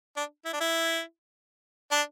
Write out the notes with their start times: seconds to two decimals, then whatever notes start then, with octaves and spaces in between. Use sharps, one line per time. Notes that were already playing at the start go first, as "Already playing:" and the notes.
0.17 D4
0.45 E4
0.53 D4
0.61 E4
1.91 D4